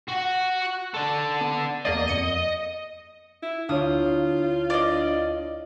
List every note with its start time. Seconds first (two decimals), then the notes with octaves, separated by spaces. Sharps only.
0.09 F#4 F#5
0.62 C#6 F#6
0.94 D4 A4
1.41 B3
1.85 E2 A#3 D5 D#5
2.08 F2 C#7 D#7
3.42 E4
3.69 D2 D4 E4 F4 C#5 F5 D#6
4.70 D5 D#5